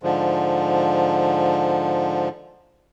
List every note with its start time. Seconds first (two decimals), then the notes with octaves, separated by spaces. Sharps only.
0.03 G#2 D3 F3